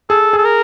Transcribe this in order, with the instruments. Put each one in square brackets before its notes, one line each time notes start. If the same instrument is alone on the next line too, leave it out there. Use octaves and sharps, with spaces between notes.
[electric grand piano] G#4 [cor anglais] A4
[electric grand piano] G#4
[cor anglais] A4
A#4